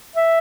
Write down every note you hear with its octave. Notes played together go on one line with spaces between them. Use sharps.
E5